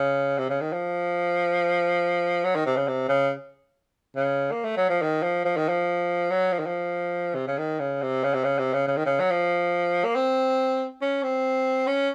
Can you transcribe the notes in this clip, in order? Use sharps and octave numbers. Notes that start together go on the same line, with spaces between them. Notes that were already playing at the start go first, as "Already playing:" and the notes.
Already playing: C#3
C3
C#3
D#3
F3
F#3
D#3
C3
C#3
C3
C#3
C#3
A#3
A3
F#3
F3
D#3
F3
F3
D#3
F3
F#3
F3
D#3
F3
C3
C#3
D#3
C#3
C3
C#3
C3
C#3
C3
C#3
C#3
D#3
C#3
F#3
F3
A#3
C4
C#4
C4
C#4